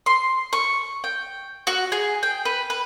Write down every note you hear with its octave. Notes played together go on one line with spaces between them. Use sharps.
C6
C#6
G5
F#4
G#4
G5
B4
B4